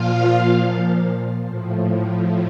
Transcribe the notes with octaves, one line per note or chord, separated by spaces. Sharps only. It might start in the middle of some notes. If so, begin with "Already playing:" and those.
Already playing: A#2 F3 F4 F5
A2 F3